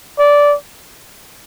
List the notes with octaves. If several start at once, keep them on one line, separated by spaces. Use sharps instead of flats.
D5